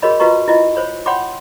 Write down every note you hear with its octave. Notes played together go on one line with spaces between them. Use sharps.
F#4 G#4 A#4 C#5 D#5 B5
F4 F#4 B4 D#5 A#5 C#6
E4 F4 D#5
C5 C#5 B5
C#5 F#5 G5 B5 C6 D6